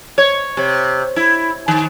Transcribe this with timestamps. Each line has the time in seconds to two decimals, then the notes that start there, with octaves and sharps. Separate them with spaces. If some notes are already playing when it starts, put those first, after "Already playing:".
0.18 C#5
0.57 C3
1.16 E4
1.68 D#3